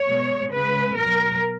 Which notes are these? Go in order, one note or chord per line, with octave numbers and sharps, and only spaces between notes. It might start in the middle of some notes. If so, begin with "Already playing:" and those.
Already playing: C#5
B2 G#3
C#3 G#3 B4
B2 F#3 A#4